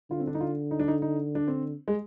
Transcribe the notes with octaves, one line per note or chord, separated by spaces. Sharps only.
D3 F4
C4
D4
D#4
F4
D#4
D4
D#4
D#4
D4
C4
G#3